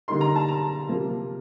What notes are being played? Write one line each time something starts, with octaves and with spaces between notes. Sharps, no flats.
D3 G3 A#3 D#4 C6
A#5
A5
A#5
C3 F3 A#3 F4